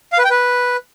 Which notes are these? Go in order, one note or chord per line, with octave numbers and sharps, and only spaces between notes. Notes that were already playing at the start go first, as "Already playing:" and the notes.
F5
B4
G5
B4